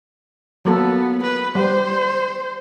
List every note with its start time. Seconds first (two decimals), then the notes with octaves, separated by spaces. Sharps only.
0.65 F#3 A#3 B3 A4
1.23 B4
1.55 G3 C5